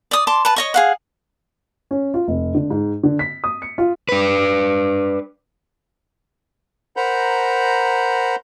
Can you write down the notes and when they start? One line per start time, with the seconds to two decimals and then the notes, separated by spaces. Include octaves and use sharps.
0.11 D5 D#6
0.27 A5 C6 D6
0.45 B4 A5
0.56 C#5 D#5 C#6
0.74 G#4 F5 F#5
1.91 C#4
2.14 F4
2.28 F1
2.55 D3
2.70 G#2
3.03 D3
3.19 B6
3.44 D#6
3.62 C#7
3.78 F4
4.09 D4 B4
6.97 A#4 C5 F#5 A#5 B5 G6